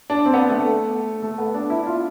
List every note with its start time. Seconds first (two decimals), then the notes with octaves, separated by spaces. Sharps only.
0.10 D4
0.25 C4
0.34 B3
0.49 A3
1.22 A3
1.38 B3
1.54 D4
1.70 E4
1.86 F4